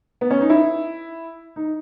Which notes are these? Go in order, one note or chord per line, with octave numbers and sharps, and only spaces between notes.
B3
C#4
D#4
E4
D#4